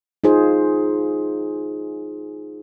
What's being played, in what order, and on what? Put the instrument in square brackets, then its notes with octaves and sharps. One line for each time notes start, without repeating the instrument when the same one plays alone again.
[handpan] D#4 F4 G#4 C5